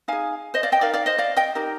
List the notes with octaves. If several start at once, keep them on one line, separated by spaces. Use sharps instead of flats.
D#4 G#4 F5 G#5
C5 D#5
D5 F5
D#5 G5
D#4 A#4 D5 F5
D5 F5
C5 D#5
D5 F5
D#5 G5
D#4 G4 A#4